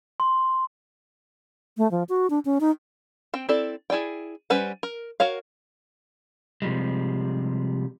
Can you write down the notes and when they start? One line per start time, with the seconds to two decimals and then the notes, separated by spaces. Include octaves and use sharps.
0.20 C6
1.78 A3
1.91 F3
2.09 F#4
2.30 D4
2.45 C#4
2.61 D#4
3.34 C4 G5
3.49 C4 E4 A4 D5
3.90 E4 G#4 D5 G5
4.50 G3 C#4 B4 C5 F#5
4.83 A#4
5.20 F#4 A#4 C#5 F5
6.62 C3 F3 G3 G#3